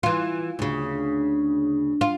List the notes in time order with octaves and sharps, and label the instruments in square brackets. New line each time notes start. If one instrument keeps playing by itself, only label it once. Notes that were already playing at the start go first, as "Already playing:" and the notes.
[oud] E3 F4
D2 C#3
F4